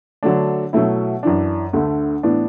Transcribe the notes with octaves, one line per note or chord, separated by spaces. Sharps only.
D3 F#3 A3 D4
B2 F#3 A3 E4
F#2 E3 D4
D2 D3 A3
A2 E3 B3 D4